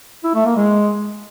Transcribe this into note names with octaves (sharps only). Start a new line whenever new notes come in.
E4
A3
A#3
G#3